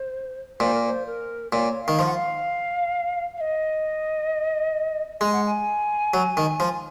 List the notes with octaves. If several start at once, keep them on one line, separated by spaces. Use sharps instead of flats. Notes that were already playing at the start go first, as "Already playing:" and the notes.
Already playing: C5
A#2 C5
A#4
C5
A#4
A#2 C#5
D#3 F5
F3
F#5
F5
F5
D#5
G#3 G#5
F#5
G#5
F#3
D#3
F3